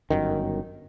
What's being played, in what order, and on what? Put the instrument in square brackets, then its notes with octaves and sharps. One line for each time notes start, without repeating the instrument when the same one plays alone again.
[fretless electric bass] G1 F#2 D#3